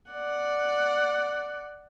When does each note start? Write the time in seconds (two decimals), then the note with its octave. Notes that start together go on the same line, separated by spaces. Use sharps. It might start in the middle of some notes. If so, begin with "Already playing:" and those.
0.11 D5 F#5